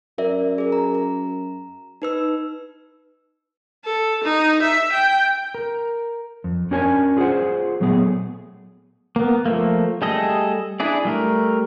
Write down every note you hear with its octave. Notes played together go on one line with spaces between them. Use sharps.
F#2 A#4 D5 E5
G#4 A#4
A#5
A#5
D#4 B4 E6
A4
D#4
E5
G5
A#4
F2
C#4 D4 F#4 A#4 C#5 G#5
F4 G#4 A4 C5 F#5
A#2 F#3 A3 B3 G#4
A#3 B3
F3 A3 A#3
G3 A3 G#4 A4 D#5
D4 E4 G#4 D5
G3 A3 A#4